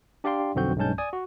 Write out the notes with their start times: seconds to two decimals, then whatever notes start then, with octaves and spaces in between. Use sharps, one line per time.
0.24 D4 G4 D5 F5 G5 C6
0.55 B1 F2 D3 C4 F#4 G6
0.77 B1 G2 G#3 C#4 A5 G6
0.98 D5 G#5 D#6
1.13 F#4